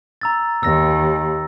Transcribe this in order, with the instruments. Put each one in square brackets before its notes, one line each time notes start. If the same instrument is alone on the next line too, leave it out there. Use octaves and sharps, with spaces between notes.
[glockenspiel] A#5 E6 A6
[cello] D#2 [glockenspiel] E6 A#6